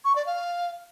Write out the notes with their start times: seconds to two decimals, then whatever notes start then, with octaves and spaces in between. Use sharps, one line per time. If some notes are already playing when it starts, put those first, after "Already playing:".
0.05 C#6
0.16 D5
0.26 F5